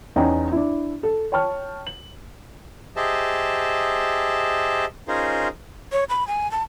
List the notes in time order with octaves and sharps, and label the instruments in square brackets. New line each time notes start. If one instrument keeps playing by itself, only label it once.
[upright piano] E2 C#4 D#4 G5 G#5 A#5
D4 E4
A4
C#5 G5 A5 C#6 F6
F#7
[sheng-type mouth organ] G4 G#4 C5 D#5 E5 A5
C#4 D#4 F4 G#4 A#4 C5
[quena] C#5
B5
G#5
A5